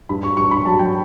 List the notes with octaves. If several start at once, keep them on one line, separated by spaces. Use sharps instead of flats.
G2 B5
C#6
G2 C#6
B5
F#3 A5
G5